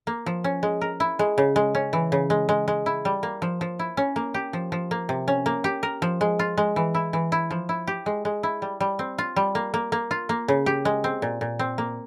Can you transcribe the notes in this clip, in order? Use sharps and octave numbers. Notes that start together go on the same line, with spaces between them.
A#3
F3
C#4
G#3
A#4
E4
G#3
C#3
G#3
C#4
E3
C#3
G#3
G#3
G#3
E4
G3
A#3
F3
F3
E4
C#4
A#3
G4
F3
F3
A#3
C3
C#4
A#3
G4
A#4
F3
G#3
F4
G#3
E3
E4
E3
E4
F3
E4
G4
G#3
G#3
E4
G3
G3
C4
F4
G3
A#3
A#3
A#3
F4
A#3
C#3
G4
G#3
C4
A#2
A#2
C4
A#3